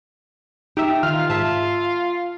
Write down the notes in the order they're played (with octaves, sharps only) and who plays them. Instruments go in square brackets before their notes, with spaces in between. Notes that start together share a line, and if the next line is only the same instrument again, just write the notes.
[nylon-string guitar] D#4 [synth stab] G4 E5
[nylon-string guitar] D#3 [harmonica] F4 F5 [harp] F6
[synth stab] G#2 E5 [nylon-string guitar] A5